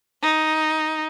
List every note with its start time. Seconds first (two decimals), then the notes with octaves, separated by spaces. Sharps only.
0.22 D#4